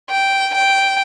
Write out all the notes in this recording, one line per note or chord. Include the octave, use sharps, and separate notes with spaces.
G5
G5